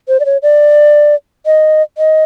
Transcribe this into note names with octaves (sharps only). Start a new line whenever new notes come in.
C5
D5
C#5
D5
D#5
D#5